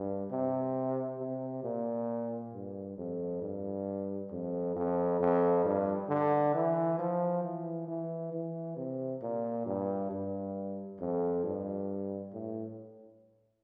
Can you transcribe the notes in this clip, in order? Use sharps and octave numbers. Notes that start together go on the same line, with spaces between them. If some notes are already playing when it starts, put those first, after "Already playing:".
Already playing: G2
C3
C3
A#2
G2
F2
G2
F2
F2
F2
G2
D3
E3
F3
E3
E3
E3
C3
A#2
G2
G2
F2
G2
A2